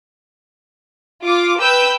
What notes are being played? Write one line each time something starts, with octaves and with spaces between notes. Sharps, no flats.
F4 D6
B4 G5 E6 G6